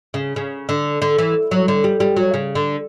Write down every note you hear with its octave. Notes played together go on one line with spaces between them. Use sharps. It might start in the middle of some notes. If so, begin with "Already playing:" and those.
C#3
C#3
D3
D3
E3
F#3
D3
G3
G3
F#3
C#3
D3